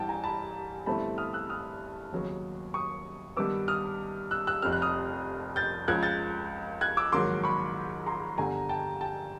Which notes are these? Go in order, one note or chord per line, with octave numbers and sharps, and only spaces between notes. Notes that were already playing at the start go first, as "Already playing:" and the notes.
Already playing: A1 G2 E3 G5 A5
G#5 A#5
A5 B5
G1 G2 E3 A3 C4 A5 B5
D#6 F6
E6 F#6
D#6 F6
D#2 C#3 F#3 B3
C#6 D#6
G2 D#3 G3 B3 D6 E6
D#6 F6
E6 F#6
E6 F#6
F1 F2 C3 F6
F#6
D#6 F6
G6 A6
C#2 C#3 F3 F#6 G#6
G6 A6
F#6 G#6
D6 E6
A#1 G#2 D#3 F#3 C6 D6
B5 C#6
A#5 C6
G1 G2 D3 G3 G#5 A#5
G5 A5
G5 A5